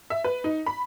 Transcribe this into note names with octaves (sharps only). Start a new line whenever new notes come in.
E5
B4
D#4
B5